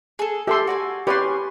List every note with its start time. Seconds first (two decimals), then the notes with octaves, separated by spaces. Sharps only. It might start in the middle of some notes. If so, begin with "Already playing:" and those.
0.19 G#4 A4
0.47 G4 A4 E5 C6
0.67 F#4 D5 G#5
1.07 C#4 G4 B4 D5 G#5 C6